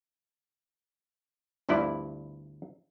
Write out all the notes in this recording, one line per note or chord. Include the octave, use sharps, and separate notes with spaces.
G1 D2 G2 E4 D5